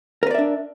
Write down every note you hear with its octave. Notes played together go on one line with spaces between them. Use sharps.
D4 A#4 B4 D5 E5